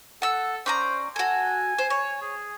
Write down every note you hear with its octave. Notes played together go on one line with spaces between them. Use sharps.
A4 F#5 E6
C#4 C5 D5 A#5
F#4 A4 G#5
C5
C#5
G#4